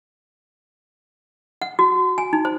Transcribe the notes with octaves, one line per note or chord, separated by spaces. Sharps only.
F#5
F#4
G#5
D#4
C5